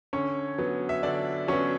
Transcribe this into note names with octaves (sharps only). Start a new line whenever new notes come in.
D3 C#4 C#5
F#3 B3
E5
D3 D4 D5
F#3 B3 C#4 C#5